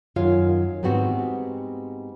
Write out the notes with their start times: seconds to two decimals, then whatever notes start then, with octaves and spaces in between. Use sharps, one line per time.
0.16 F#2 D#3 F4 C#5 F5
0.83 G#2 G3 B3 C4 F#4